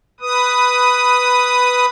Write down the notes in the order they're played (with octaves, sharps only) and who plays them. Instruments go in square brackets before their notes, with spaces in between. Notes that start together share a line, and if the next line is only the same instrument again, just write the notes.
[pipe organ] B4 D#6